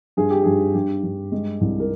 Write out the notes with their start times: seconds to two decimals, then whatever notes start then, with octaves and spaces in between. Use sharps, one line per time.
0.17 G2 G#4
0.30 G4
0.43 G2 G#4
0.75 G2 G4
1.03 G2
1.32 G#3
1.61 C2
1.80 A#4